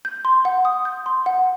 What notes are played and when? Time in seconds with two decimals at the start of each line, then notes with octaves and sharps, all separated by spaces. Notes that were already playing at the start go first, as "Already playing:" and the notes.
0.05 G6
0.25 C6
0.45 F#5
0.65 D#6
0.85 G6
1.06 C6
1.26 F#5